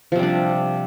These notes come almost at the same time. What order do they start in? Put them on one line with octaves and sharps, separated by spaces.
F3 C3 G3 D4